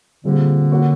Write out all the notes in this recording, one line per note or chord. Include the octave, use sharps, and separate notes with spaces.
A#2 D3 G3 C4 F4 G#4
A#3 C#4 F#4 A#4